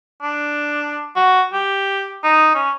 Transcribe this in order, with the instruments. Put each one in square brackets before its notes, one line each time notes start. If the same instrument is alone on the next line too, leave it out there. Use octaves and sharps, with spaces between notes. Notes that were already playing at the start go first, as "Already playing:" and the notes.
[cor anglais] D4
F#4
G4
D#4
C#4